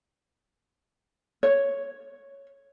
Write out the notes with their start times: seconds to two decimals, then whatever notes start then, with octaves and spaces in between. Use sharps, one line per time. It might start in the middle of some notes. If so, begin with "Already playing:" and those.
1.43 C#5